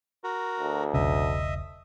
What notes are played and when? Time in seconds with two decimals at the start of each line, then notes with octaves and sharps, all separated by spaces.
0.24 F#4 A#4
0.61 D2
0.94 E1 B1 C#3 D#5 E5